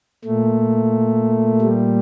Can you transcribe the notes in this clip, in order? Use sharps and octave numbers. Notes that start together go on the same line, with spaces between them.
A#2 A3
G3